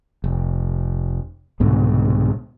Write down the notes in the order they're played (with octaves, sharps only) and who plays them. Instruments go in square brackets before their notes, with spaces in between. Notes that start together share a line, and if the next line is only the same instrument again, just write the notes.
[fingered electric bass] F1
C2 G#2 B2 D3